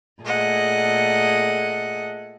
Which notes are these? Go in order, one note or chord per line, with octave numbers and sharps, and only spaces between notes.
A#2 A3 G#4 A4 D#5 F#5